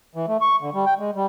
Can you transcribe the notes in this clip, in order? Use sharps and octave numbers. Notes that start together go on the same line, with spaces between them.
E3
A3
C#6
D3
G3
G5
G#3
G3